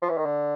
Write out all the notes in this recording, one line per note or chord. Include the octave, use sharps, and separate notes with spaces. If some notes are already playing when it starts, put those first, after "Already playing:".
F3
E3
D#3
D3